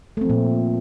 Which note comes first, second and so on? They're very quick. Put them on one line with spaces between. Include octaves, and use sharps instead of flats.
A3 C4 F3 A#2